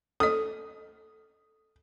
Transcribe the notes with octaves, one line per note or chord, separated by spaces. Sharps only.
A4 D#5 D#6